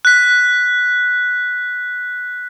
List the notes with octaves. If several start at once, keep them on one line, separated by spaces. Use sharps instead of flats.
F#6 B6